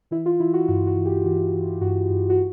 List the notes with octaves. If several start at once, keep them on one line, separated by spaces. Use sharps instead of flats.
E3 E4
F4
E3 E4
F#4
G2 F#4
F#4
E3
G4
E3 F#4
E3
G2 F#4
G2
F#4